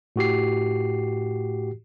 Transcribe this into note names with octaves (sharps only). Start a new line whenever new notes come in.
A2 F#4 G4 C7